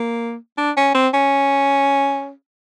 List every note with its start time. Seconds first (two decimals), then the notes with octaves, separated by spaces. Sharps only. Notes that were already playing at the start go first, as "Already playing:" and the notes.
Already playing: A#3
0.58 D4
0.77 C#4
0.95 C4
1.14 C#4